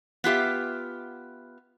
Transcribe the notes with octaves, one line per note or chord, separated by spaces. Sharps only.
B3 F4 G4 E5